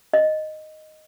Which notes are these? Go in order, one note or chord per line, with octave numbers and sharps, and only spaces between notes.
D#5